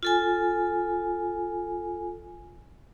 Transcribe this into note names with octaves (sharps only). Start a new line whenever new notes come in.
F4 A4 G#5